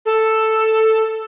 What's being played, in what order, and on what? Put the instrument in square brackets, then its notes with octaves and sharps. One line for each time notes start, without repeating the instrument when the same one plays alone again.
[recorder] A4